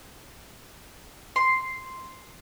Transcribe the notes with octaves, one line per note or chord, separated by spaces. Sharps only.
C6